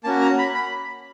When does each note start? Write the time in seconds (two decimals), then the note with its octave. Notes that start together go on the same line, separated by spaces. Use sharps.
0.04 A#3 C#4 F#4 A5
0.21 A#5
0.39 B5
0.55 B5